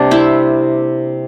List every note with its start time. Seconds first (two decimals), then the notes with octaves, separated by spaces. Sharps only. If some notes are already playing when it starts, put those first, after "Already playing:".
Already playing: C3 G3 A#3 D4 G4
0.11 C4 E4